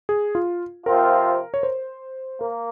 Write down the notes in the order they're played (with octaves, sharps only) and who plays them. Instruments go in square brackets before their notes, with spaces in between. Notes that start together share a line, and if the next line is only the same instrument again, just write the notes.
[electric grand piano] G#4
F4
[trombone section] C3 F3 C4 F4 [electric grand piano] A#4
[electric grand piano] C#5
C5
[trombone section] A#3 [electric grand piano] A#4